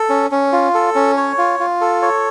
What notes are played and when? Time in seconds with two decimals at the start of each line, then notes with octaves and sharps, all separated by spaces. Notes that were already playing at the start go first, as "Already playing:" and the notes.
Already playing: A4
0.09 C#4
0.31 C#4
0.52 F4
0.74 A4
0.95 C#4
1.17 C#5
1.38 F4
1.60 F4
1.81 A4
2.02 C#5